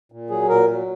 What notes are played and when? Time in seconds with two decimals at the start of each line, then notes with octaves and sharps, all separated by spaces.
0.12 A#2
0.30 F#3 G#4
0.49 A#2 A#4
0.69 F#3